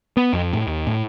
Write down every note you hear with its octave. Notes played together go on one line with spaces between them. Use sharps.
B3
F2
A2
D#2
A2